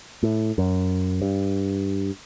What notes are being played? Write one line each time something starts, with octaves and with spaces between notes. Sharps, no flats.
A2
F#2
G2